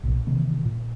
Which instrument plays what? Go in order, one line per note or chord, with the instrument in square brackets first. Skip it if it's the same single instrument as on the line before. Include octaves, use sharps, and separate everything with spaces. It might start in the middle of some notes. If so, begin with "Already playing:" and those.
[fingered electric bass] B1 A#2
C3 D#3 E3 A#3
A#2